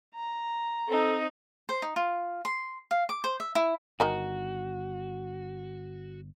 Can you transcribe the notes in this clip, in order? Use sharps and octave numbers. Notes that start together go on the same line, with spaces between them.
A#5
C4 D#4 A4
C5
D#4
F4
C6
F5
D6
C5
E5
E4
G1 D#3 D#4 F#4 G#5